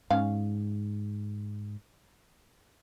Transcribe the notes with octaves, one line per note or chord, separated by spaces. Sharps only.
G#2 C#4 F5